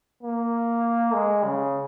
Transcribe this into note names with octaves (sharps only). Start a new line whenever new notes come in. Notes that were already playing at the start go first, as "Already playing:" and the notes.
A#3
G#3
C#3